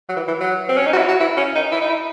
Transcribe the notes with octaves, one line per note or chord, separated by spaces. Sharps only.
F#3
E3
E3
F#3
C4
C#4
D#4
F#4
E4
F#4
E4
C#4
D#4
E4
D#4
E4